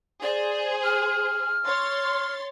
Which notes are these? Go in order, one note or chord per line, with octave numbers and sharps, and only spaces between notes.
G#4 C5 D5
F6
C#5 C6 A6